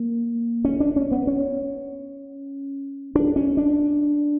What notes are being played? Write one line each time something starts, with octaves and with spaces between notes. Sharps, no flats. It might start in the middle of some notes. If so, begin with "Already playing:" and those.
Already playing: A#3
C#4
D4
C#4
B3
C#4
D4
C#4
D4